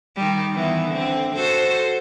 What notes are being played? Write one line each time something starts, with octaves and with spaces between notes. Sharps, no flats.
D#3 G3
D#3 E3 B3
D3 C4
F#4 A4 C5